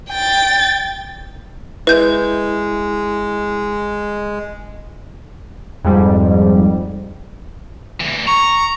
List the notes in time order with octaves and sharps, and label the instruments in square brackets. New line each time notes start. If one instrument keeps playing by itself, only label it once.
[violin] G5 A6
[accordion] G#3 [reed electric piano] E4 [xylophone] B4 G6
[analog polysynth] F2 G#2 G3
[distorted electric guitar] D2 E3
[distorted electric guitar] A#5 [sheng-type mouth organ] C#6